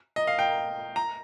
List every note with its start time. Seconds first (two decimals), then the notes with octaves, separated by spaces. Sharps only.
0.16 D#5
0.27 F5
0.39 G5
0.96 A#5